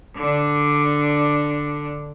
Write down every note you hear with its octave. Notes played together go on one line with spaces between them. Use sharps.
D3 D4